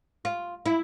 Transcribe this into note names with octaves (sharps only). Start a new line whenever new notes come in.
F4
E4